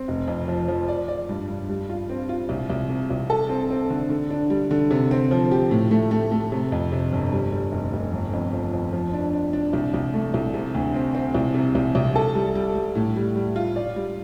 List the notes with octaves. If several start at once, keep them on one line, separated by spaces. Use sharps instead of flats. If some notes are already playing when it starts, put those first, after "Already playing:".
Already playing: C4
F1
F2
F3
F3
D5
D5
G2
G2
G3
F4
C4
F4
C2
C2
C3
C2
A4
C4
C4
D3
D3
D4
G3
D3
C3
C4
F3
G4
A2
A3
A3
A3
C3
F2
C3
G1
G3
G3
F1
F1
G1
F2
F3
F2
F3
D4
D4
D4
C2
C2
A3
C2
C3
D2
C4
C4
C2
C3
C2
C2
A4
G3
G3
G3
A2
G3
G3
F4
D5
G3